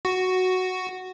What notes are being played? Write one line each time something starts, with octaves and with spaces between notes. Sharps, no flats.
F#4